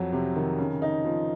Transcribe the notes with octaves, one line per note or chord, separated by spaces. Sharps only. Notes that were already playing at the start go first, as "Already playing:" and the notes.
Already playing: F2 F#3
C3
D#3
C#3
D#4
F3